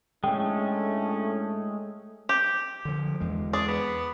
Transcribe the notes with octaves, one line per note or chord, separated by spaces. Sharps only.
A2 G#3 A3 C#4 D4 G5
G4
D3 F3
E2 G#3
G#4 D5
B3